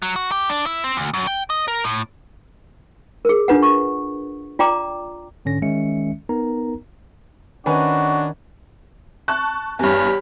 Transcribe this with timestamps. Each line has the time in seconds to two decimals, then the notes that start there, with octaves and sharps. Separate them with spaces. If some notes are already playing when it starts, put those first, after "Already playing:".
0.02 F#3
0.16 F#4
0.31 G4
0.50 D4
0.66 E4
0.84 C4
0.97 D2
1.14 F#2
1.27 G5
1.50 D#5
1.68 A#4
1.84 A2
3.25 G#4 A#4
3.48 D4 F4 B4 F#5
3.62 C#6
4.59 F4 D5 G5 A#5 D6
5.45 G#2 D3 C#4 A#6
5.62 D#3 G#3 C#4 E5 C#7
6.29 B3 D#4 A#4 A#5
7.66 D#3 C#4 D4 F#4 B4 G#5
9.28 A5 C#6 F#6
9.79 E2 G2 G4 C#5 B5